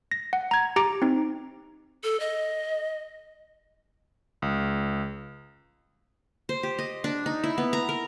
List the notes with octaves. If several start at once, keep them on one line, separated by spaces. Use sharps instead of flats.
A#6
F#5
A#5 G#6
G4 A#5 D6 D7
C4 D#4
A4
D#5
C#2
C5
G4
D#5
D4
D#4
E4
B3
A#5
A#4